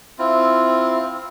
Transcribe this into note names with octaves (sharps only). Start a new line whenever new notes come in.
C4 E4 F4